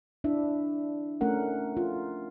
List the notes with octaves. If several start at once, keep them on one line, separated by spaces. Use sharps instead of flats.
D4 E4 E5
A3 C#4 A#4 F#5
F4